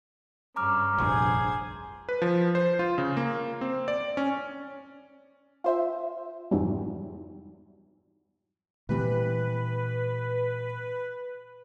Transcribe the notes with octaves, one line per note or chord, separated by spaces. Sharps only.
G2 C#3 A#5 D6 F6
F1 A#1 G2 G#4 C5 G#5
B4
F3
C5
F4
C#3
A#3
C4
D5
C#4
F4 C5 E5
F2 G#2 C3 E3 F#3 G3
A#2 E3 G3 C4 B4